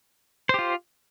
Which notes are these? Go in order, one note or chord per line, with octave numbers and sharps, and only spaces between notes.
F4 G4 C5